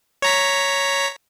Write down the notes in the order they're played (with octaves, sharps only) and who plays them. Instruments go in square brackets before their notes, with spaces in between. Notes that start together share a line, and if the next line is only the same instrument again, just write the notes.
[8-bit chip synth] C#5 A#5 B6